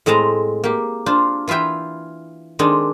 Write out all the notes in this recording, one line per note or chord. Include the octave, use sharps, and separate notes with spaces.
A2 G#3 C4 A5 A#5
A#3 G4
D4 F4 C5
E3 F4 B4 E5 G5
D#3 G#3 C4 D4